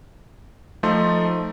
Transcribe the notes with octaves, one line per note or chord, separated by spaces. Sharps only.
F3 A3 D#4 C6